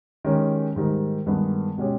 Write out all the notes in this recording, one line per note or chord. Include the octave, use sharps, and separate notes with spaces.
D#3 G#3 C#4 G4
G#2 D#3 G3
G2 D#3 G#3 B3
B2 G#3 C#4 G4